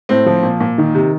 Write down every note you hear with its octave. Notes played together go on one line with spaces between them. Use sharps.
A2 C4
F3
A#2
A#2
D#3
C3